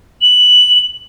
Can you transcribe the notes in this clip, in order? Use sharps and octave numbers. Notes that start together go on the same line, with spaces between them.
F#7